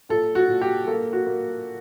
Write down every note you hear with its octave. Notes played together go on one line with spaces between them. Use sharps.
A#2 A4
F#4
A#2
G4
A#3 A4
F#4
A#3